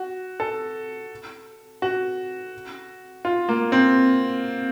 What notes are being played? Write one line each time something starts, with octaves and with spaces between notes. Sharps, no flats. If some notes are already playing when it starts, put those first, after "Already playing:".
Already playing: F#4
A4
F#4
F4
A#3
C4